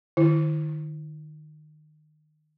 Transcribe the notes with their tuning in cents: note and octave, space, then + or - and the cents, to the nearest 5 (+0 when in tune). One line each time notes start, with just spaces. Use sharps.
D#3 -30 E4 +20